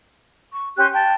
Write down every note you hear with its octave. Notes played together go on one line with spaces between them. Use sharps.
C#6
C#4 G4 C6 F#6
G5 A5